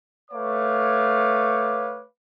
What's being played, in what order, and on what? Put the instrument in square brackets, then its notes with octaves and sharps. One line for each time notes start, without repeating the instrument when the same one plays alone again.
[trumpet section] A3 B4 C#5 F5 D6